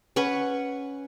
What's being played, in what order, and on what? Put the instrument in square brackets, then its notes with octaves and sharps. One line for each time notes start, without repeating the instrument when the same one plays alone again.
[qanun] C#4 B4 F#5 C#6